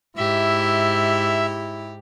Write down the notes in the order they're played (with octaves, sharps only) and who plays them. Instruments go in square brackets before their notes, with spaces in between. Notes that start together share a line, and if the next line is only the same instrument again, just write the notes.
[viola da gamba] G#2 G4 [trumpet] E4 [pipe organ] E5